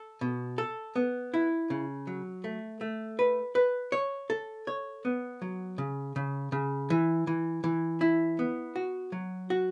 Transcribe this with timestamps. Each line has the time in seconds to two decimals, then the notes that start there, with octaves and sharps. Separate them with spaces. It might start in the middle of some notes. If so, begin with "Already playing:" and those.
Already playing: A4
0.21 B2
0.58 A4
0.96 B3
1.34 E4
1.70 C#3
2.07 F#3
2.44 A3
2.81 A3
3.19 B4
3.55 B4
3.92 C#5
4.30 A4
4.67 C#5
5.05 B3
5.42 F#3
5.78 C#3
6.16 C#3
6.52 C#3
6.90 E3
7.27 E3
7.64 E3
8.01 E4
8.39 B3
8.76 F#4
9.12 F#3
9.50 F#4